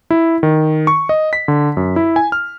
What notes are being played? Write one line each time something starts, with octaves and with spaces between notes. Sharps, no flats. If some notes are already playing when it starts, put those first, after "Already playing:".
E4
D#3
C#6
D#5
B6
D3
F#2
E4
G#5
F6